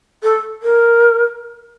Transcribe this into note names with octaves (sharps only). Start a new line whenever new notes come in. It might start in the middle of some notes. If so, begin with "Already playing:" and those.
A4
A#4